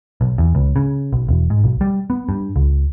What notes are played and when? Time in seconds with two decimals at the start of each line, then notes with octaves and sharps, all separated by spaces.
0.21 B1
0.38 E2
0.55 C#2
0.76 C#3
1.13 B1
1.29 E1
1.50 G#2
1.64 B1
1.81 G3
2.10 B3
2.29 G2
2.56 C#2